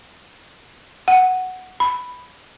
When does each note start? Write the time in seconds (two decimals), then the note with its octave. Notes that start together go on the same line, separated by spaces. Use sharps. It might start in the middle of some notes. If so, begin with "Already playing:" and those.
1.08 F#5
1.80 B5